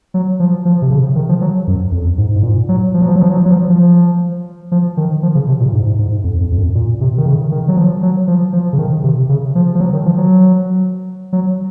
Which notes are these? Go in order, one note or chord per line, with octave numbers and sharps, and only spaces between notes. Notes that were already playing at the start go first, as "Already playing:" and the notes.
F#3
F3
F3
C3
C#3
D#3
F3
F#3
F#2
F2
G#2
G#2
A#2
F#3
F3
F#3
F3
F#3
F3
F#3
F3
F#3
F3
F3
F3
D#3
F3
C#3
C3
A#2
G#2
G#2
F2
F2
F2
F#2
A#2
C3
D#3
C#3
D#3
F#3
F3
F#3
F3
F3
C#3
D#3
C3
C#3
F3
F3
F#3
D#3
F3
F#3
F#3